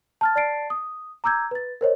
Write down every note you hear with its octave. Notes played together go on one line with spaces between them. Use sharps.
A5 F6 A6
D5 A5 A6 C7 D7
D#6
A#5 D6 E6 G6 G#6
B4 A6
A#4 C5 C#5 D#5